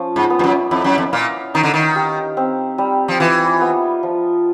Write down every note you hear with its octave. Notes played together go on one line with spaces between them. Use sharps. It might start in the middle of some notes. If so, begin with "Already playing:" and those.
Already playing: F3 C#4
G#2
B3
G2
F#2
F2 E4
F#2
F2
A#2 F5
D#3 D#4
D3
D#3
G4
C4
G3
F3
E3 F4
B3
F3